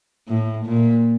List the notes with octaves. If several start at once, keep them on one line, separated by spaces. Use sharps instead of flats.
A2
A#2